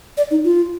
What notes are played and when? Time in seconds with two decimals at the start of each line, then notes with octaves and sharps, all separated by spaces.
0.17 D5
0.31 D#4
0.44 F4